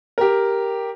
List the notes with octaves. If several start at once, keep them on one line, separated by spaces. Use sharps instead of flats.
G4 A#4